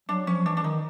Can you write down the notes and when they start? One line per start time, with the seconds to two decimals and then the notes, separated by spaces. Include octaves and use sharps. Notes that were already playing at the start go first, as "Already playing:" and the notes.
0.09 F#3 D4
0.27 F3 C#4
0.45 E3 D4
0.57 D4
0.64 D#3 D#4